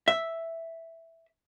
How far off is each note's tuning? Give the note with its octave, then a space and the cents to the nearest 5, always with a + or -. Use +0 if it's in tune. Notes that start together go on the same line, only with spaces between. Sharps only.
E5 +0